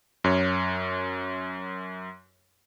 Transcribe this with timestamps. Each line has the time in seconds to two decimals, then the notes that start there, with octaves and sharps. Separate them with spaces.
0.24 F#2 C#5